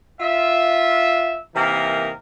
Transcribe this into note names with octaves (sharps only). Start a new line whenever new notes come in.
F4 E5
C3 E3 A#3 D#4 A#4